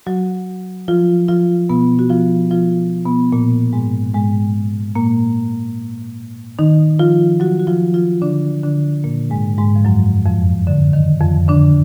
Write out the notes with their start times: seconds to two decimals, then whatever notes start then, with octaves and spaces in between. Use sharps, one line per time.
0.06 F#3 F#4
0.88 F3 F4
1.28 F3 F4
1.69 B2 B3
1.99 F#4
2.10 F3 F4
2.51 F3 F4
3.05 B2 B3
3.32 A#2 A#3
3.73 G#2 G#3
4.14 G#2 G#3
4.95 A#2 A#3
6.59 D#3 D#4
6.99 F3 F4
7.40 F#3 F#4
7.59 F#4
7.67 F3 F4
7.94 F3 F4
8.22 D3 D4
8.63 D3 D4
9.04 A#2 A#3
9.30 G#2 G#3
9.58 G#2 G#3
9.76 F3
9.85 F#2 F#3
10.26 F2 F3
10.67 D3
10.93 D#3
11.21 F2 F3
11.49 D3 D4